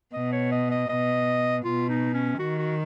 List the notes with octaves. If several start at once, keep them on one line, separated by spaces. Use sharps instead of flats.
B2 D#5
C#5
D#5
D#5
B2 D#5
B2 F4
D#4
C#4
D#3 F#4
F#4